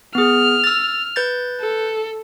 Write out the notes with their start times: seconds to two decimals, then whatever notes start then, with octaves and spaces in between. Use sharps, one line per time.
0.15 B3 G#4 F6
0.64 E6 A6
1.16 B4 G6 A6
1.60 A4